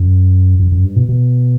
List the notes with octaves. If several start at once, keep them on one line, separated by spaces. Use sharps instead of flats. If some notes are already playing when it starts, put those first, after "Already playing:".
Already playing: F#2
F#2
F#2
G2
B2
B2